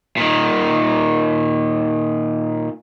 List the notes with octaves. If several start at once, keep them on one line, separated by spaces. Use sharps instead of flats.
A#2 D#3